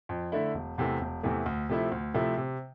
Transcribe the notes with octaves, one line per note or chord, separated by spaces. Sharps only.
F2
D3 A3 E4
E1
E2 C3 E3 A3
E1
E2 C3 E3 A3
D2
C3 F3 A3 E4
D2
C3 F3 A3 E4
C3